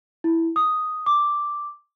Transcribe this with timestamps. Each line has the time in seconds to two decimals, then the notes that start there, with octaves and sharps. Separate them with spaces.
0.24 E4
0.56 D#6
1.06 D6